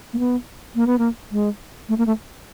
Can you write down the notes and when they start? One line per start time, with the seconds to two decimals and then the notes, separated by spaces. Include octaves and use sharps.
0.13 A#3
0.19 B3
0.75 A#3
0.87 B3
0.98 A#3
1.32 G#3
1.89 A3
1.98 A#3
2.07 A3